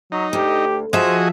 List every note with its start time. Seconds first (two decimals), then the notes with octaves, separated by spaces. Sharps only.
0.12 F#3 D#4
0.33 D2 G4
0.93 F3 F#4 G#4 C5 D#5 E5